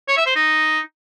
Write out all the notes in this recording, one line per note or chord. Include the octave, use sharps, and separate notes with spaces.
C#5
E5
C5
D#4